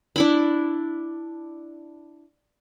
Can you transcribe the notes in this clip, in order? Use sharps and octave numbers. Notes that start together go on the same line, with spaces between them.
D4 E4 B5